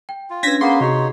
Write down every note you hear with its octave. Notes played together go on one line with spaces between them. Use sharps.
G5
F4
C#4 D4 B4 G#6 A#6 B6
A#3 B3 G#4 A#5 C6
C3 D#4 F#4 G#4 C#5